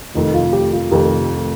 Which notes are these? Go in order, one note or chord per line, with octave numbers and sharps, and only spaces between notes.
F1 F2 D#3 A3 D#4
F4
G4
F4
F1 F2 D#3 A3 G4